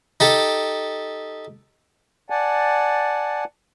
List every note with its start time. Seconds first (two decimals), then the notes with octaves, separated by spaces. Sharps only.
0.20 D#4 G4 A4
2.30 D5 F#5 G#5 A5